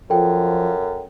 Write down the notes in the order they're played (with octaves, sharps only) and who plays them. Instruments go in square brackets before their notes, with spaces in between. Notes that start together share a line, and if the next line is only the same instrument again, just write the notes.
[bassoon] F#2 [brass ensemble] F3 [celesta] A4 G5